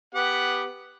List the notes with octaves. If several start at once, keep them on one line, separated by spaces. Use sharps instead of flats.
B3 G4 F#5